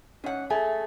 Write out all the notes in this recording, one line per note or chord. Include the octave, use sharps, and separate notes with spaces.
G#2 C#4 F#5
A3 G#4 G#5